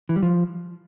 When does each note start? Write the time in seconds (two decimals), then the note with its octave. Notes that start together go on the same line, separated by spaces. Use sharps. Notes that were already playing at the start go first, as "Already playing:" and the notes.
0.09 E3
0.16 G3
0.23 F3